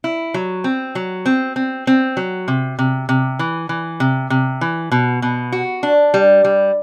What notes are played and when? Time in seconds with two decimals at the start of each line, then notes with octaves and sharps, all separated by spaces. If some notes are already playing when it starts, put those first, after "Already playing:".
0.04 E4
0.34 F#3
0.64 C4
0.95 F#3
1.26 C4
1.56 C4
1.87 C4
2.17 F#3
2.48 C3
2.79 C3
3.09 C3
3.39 E3
3.69 E3
4.00 C3
4.30 C3
4.61 E3
4.92 B2
5.22 B2
5.52 F#4
5.83 D4
6.14 G3
6.44 G3